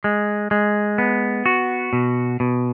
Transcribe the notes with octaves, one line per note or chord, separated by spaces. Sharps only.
G#3
G#3
B3
F#4
B2
B2